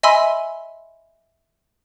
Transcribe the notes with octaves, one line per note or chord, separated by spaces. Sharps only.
D#5 E5 G#5 B5 C6 E6